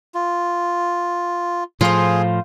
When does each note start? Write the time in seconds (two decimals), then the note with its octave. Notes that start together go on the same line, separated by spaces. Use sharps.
0.15 F4
1.81 A2 F3 F4 G#4 C5